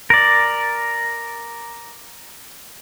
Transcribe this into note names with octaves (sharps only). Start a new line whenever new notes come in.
A#4 D5